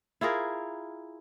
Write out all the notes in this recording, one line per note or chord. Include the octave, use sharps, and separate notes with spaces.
E4 F4 G#4 A#4